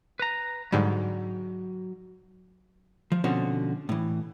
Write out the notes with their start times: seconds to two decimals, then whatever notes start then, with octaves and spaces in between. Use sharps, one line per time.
0.19 B4 A#5
0.72 G#2 D3 F#3 G3
3.12 F3
3.24 B2 D3 F3 C4 C#4 F#4
3.89 A2 E3